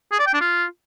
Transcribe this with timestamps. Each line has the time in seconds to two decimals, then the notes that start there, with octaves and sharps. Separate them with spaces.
0.12 G#4
0.19 D5
0.26 G5
0.33 D4
0.41 F4